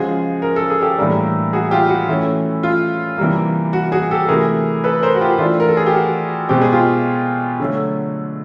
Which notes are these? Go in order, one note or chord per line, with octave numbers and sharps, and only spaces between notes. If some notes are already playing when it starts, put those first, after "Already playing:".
Already playing: C#3 F3 G#3 F#4 G#4
A#4
A4
G#4
G4 A4
A2 E3 G3 A#3 D4
F#4 G#4
F4 G4
F#4
E3 A3 C#4
F4
C3 E3 G3 A#3
F#4
F#4 G#4
G4 A4
C3 E3 A3 G#4 A#4
A4 B4
A#4 C5
F#4
F4 G4
E3 A3 D4 F4
A#4
A4
G#4
G4
F#4
B2 G#3 C4 G4
G#4
F4 G4
D3 F#3 A3